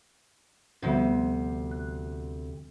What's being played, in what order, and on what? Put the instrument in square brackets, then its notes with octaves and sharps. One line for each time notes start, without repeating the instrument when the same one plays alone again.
[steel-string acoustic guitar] D2 C3 [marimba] F3 G3 B3
[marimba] F#6